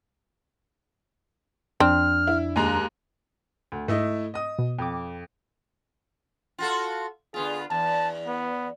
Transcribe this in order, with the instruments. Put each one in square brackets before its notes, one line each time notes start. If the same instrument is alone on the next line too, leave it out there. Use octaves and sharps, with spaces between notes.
[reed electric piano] F2 D4 [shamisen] C4 [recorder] F6
[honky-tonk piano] E4
[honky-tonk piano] D#2 G#3 A#5 [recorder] F#6
[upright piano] D2
[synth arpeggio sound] G#2 [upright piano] A3 E4 D#5
[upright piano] D#5 D#6
[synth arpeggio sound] B2
[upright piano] F2 [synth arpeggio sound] G5 D6
[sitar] F4 F#4 A4
[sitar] D3 B3 F4 [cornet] G#4
[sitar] E2 [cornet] A5
[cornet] B3